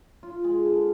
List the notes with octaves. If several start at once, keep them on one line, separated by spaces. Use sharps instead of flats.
F4
G#3
D3